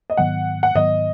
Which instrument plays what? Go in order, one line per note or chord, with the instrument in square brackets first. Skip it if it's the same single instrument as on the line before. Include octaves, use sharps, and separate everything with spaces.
[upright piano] D#5
[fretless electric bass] G#2 D#3 F#3 B3 [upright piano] F#5
[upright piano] F#5
[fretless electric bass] G#2 D#3 F#3 B3 [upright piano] D#5